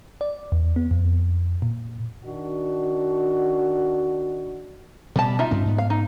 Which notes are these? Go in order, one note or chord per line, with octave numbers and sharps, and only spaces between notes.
D5
E2
B3
F2
A#2
D#3 D4 F#4
B2 G3 A5
D#4 F4 E5
G2 C4 C#4
G#2 B3
F5
D#4